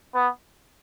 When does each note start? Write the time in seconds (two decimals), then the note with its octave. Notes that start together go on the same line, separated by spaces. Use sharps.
0.14 B3